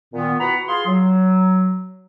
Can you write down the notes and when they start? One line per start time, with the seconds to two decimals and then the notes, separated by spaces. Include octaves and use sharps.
0.13 A#2 D#3 B3
0.40 B3 E4 F#4 F#5 A#5 B5
0.67 F4 G#4 C6
0.86 F#3